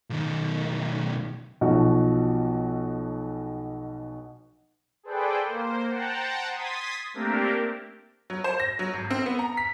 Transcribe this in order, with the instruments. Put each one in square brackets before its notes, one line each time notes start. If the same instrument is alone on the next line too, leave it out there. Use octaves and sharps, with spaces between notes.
[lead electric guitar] B1 D#3
[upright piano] B1 B2 F3 F#4
[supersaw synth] G#4 A4 B4 C5 D5 G5
A#3 C5
C5 F#5 G5 A5 A#5
C6 D#6 G#6 A6 B6
A3 A#3 C4 D4 G4 A#4
[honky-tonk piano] F#3
C5
A#6
F#3
G#1
C4
B3
A#5
B6